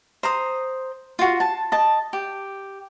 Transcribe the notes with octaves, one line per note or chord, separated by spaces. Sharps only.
C5 A#5 D#6
F4 F#4
A5
D#5 A5
G4